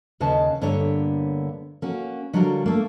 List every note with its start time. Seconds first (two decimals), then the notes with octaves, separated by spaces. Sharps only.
0.20 D#2 C#3 B4 D#5 A5
0.62 G2 D3 A#3 B3 C#5 G5
1.82 A#3 C#4 F#4
2.33 D3 F#3 G3 F4 F#4 A#4
2.66 A3 A#3